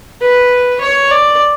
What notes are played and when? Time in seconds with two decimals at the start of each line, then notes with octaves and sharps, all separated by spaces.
0.21 B4
0.81 C#5
1.11 D5